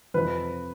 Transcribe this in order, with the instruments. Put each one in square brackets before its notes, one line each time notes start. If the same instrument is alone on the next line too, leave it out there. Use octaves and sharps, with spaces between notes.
[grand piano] F2 C3 F3 B4